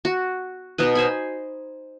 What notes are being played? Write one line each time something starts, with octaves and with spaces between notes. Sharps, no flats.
F#4
B2 B3 D#4 B4
C5 G#5 B5